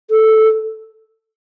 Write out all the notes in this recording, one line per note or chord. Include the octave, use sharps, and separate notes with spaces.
A4